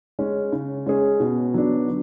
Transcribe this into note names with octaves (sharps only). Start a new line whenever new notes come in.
G#3 C#4
C#3
G#3 C#4 G#4
B2
F#3 B3 D4
D3